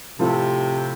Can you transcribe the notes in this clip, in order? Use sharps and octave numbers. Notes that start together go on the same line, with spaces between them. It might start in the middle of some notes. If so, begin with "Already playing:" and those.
A2 C3 F3 C4 F4 A4